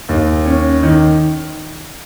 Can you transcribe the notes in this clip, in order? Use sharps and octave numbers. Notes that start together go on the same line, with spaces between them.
D#2
C#4
D#3